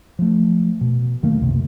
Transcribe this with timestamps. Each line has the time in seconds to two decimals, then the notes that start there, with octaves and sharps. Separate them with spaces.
0.19 F3 A3
0.81 B2
1.22 D#2 D#3 A3 A#3
1.41 C2 F#2 C3